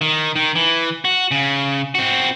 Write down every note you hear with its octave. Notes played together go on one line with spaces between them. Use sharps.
D#3
D#3
E3
F#4
C#3
C4 F#4